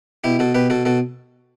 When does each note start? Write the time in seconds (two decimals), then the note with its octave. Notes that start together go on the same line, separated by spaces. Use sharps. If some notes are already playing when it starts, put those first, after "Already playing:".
0.24 B2 E4 G4
0.39 B2 F#4 A4
0.55 B2 G4 B4
0.70 B2 F#4 A4
0.85 B2 F#4 A4